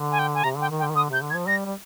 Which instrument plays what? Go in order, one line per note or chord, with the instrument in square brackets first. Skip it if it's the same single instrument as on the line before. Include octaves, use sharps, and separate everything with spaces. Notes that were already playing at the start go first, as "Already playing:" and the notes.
Already playing: [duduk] D3
[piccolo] G#5
G5
G#5
[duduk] C3 [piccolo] A#5
[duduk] D3 [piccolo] G5
[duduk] D#3
[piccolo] G5
[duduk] D3
D#3
[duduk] D3 [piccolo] D#6
[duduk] C3 [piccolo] G6
[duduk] D3
[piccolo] G#6
[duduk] F3
[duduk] G3 [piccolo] A#6
[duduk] G3